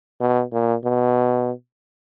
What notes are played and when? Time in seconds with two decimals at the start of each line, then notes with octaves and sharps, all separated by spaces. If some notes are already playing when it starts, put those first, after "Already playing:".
0.21 B2
0.52 A#2
0.84 B2